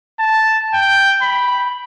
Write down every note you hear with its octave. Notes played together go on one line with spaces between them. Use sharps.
A5
G5
B5